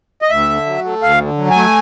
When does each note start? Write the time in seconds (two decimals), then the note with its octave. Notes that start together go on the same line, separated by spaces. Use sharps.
0.22 D#5
0.30 D2 E5
0.49 D3
0.66 F#3
0.84 A3
1.02 D2 F5
1.21 D3
1.37 F#3
1.51 G#5
1.56 A3